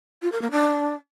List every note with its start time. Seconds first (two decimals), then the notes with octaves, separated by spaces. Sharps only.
0.22 F4
0.32 A#4
0.42 A#3
0.51 D4